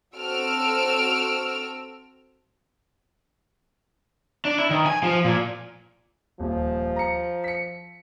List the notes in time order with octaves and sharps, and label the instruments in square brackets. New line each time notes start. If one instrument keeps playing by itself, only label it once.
[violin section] C4 F#4 A4 E6 F6 D7
[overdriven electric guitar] D4
E4
D#3
G#5
F3
A#2
[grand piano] D#1 [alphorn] F3
[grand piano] A#5 C#7
B6 C#7